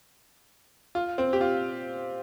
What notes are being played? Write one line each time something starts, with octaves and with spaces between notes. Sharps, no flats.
F4
C4
G4
F4